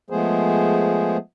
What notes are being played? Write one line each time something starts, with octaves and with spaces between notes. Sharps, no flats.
F3 G#3 A3 B3 G#4 C5